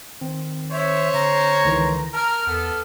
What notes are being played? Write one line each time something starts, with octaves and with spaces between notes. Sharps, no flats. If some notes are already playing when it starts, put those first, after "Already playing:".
D#3 C4
C5 C#5 E5
D3 A#5
C#2 D#3 E3
A#4 A5 F6
E2 B3 A4